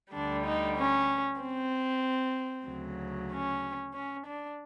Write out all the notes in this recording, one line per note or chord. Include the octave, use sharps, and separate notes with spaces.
D2 D3 G3 D4
D#4
C#4
C4
D2 C#3 F#3
C#4
C#4
D4